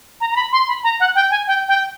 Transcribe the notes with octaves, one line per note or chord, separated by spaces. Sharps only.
A#5
A#5
B5
C6
B5
A#5
F#5
G5
G#5
G5
G5